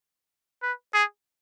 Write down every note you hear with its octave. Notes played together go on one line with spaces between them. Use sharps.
B4
G#4